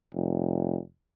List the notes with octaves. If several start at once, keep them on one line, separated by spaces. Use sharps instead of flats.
F1